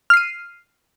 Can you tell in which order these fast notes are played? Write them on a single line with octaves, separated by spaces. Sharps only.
F6 C7 D#7